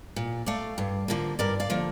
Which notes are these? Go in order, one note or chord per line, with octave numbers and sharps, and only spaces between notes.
A#2
A3 D5 F5
G2
D3 F3 A#3
G2 A#4 D5
D5 F5
D3 F3 A#3